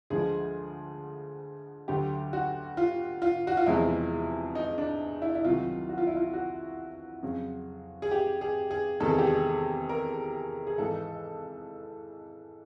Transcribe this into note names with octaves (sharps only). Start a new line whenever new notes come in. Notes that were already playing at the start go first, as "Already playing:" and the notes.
D2 D3 F3 G#3 G#4
D2 D3 F#3 G4
F#4
F4
F4
F#4
F4
E1 E2 C3 F3 G#3 E4
D#4
D4
E4
E4
C2 C3 D#3 F#3 F4
F#4
F4
E4
F4
F#4
F2 C#3 F#3
G#4
G4
G#4
G#4
E2 C3 D#3 G#3 A4
G#4
G4
G#4
A#4
G#4
G#1 G#2 E3 G#3 A4